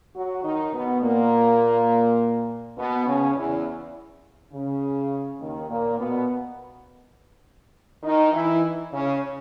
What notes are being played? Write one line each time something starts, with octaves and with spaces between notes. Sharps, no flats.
F#3 F#4
D#3 D#4
B2 B3
A#2 A#3
B2 B3
C#3 C#4
E2 E3
C#3
D#2 D#3
A#2 A#3
B2 B3
D#3 D#4
E3 E4
C#3 C#4